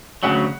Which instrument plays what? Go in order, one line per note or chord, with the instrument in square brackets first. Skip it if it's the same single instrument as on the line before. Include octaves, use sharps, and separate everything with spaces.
[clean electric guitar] D2 C#3 F#3 [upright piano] F#5